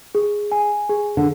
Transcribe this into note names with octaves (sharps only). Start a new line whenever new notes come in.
G#4
G#5
G#4
D3